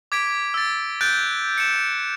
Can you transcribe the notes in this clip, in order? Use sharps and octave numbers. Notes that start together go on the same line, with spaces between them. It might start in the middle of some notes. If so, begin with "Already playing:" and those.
D6 G#6 B6 D7
E6 A6
F#6 G6 A6 D7
C#7 E7